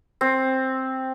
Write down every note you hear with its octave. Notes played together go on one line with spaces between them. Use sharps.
C4